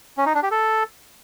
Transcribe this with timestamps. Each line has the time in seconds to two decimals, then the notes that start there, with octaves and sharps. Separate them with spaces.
0.18 C#4
0.26 D#4
0.34 D4
0.43 G4
0.51 A4